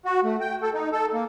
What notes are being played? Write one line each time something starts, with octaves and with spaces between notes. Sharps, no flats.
F#4
A3
G5
A4
D#4
A4
A#3